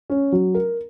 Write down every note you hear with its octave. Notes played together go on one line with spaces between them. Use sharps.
C#4
F#3
A#4